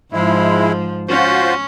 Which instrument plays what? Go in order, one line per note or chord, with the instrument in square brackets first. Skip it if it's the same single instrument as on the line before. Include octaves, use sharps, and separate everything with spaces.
[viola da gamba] G#2 F3 [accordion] G#3 E4
[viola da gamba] C#4 [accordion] F4 F#4 C5